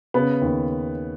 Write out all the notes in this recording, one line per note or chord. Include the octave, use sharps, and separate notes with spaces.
C#3 B3 B4
D#2